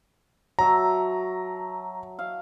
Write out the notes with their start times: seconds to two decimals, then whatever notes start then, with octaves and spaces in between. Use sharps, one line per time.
0.59 F#3 E5 A5 A#5
2.19 F5